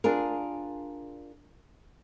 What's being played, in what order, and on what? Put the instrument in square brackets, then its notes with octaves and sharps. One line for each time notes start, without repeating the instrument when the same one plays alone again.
[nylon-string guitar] D4 F4 G#4 A#4